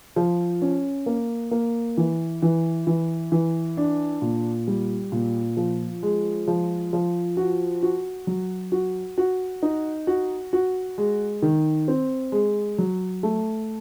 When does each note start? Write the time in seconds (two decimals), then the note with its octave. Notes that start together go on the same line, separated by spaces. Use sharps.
0.16 F3
0.62 C#4
1.06 A#3
1.51 A#3
1.97 E3
2.42 E3
2.87 E3
3.32 E3
3.77 D4
4.22 A#2
4.68 G3
5.12 A#2
5.57 F3
6.03 G#3
6.48 F3
6.93 F3
7.37 F#4
7.83 F#4
8.27 F#3
8.72 F#4
9.18 F#4
9.62 D#4
10.07 F#4
10.53 F#4
10.98 G#3
11.42 D#3
11.88 C4
12.32 G#3
12.78 F#3
13.23 A3